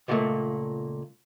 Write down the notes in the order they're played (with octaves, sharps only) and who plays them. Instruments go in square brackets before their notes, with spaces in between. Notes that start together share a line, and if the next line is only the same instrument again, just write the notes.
[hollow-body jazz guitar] C#2 A#2 F3 G3 A3 A#3